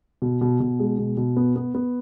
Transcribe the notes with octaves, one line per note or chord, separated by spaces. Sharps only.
B2
B2
B2
G#3
B2
B2
B3
B3
B3